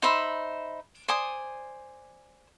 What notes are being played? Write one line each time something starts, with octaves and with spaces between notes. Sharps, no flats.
D#4 C5 E5 B5
C5 D5 G#5 D#6